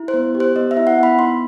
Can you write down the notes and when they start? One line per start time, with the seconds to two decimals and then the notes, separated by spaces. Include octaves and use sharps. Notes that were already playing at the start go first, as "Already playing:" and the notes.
Already playing: E4
0.08 C5
0.14 B3
0.35 G4
0.40 C5
0.56 B3 D#5
0.71 E5
0.77 E4
0.87 F#5
0.98 B3 B5
1.18 D#4 C6